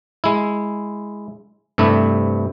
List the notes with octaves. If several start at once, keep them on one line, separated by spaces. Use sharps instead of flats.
G#3 E4
G2 C3 A3 E4